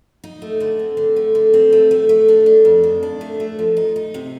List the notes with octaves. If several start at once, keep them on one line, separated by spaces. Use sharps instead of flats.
D#4
A3
D3
C4
D3
A3
D3
C4
A3
A3
A3
D4
D4
F2
D#3
D4
A3
A3
F3
D#4
D#4
C3